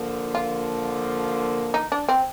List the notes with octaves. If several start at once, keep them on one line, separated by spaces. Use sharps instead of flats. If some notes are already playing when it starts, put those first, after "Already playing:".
Already playing: D3 F3 A#3
F4
D#4
D4
C4